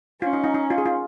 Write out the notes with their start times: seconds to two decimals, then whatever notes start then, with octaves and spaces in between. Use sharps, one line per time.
0.22 C#4 F4
0.33 D#4
0.44 D#4
0.54 D#4
0.70 F4
0.78 G#4
0.86 F4